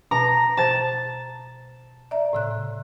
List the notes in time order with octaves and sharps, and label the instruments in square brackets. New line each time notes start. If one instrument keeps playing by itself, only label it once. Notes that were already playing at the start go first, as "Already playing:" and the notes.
[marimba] B2 B4 A5 [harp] A#5
[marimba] C5 [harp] A5 A6
[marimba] D5 E5 A#5
A2 C#3 F#6